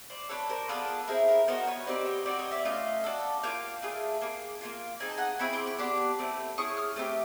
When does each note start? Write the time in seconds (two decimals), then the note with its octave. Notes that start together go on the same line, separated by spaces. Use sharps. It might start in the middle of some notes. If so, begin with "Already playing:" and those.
0.10 C5 D5
0.29 D4 F#4 A4 B4 C#5
0.49 A#4 C5
0.68 B3 D4 F4 G#4 A4 B4
1.08 C4 E4 G#4 A#4
1.28 A#4
1.47 B3 D#4 F#4 A#4 C5
1.67 B4 C#5
1.86 C4 D#4 G4 C5 D5
2.06 C#5 D#5
2.26 C4 D#4 F#4 C5 D5
2.39 C#5 D#5
2.51 D5 E5
2.65 A3 C#4 F4 D#5 F5
3.04 D4 F#4 A4
3.43 A#3 D4 F4 F5 G5
3.82 A3 D4 F4 G#4
4.22 A#3 D#4 G#4
4.61 A#3 C#4 F4
5.00 C4 D#4 G#4 G#5
5.10 A5
5.18 F#5 G#5
5.39 C4 E4 G#4 B5 C#6
5.53 C6 D6
5.66 B5 C#6
5.78 B3 D4 G4 C6 D6
6.19 A3 C4 E4
6.58 C#4 E4 G#4 C#6 D#6
6.77 D#6 F6
6.96 A3 C4 D#4 G4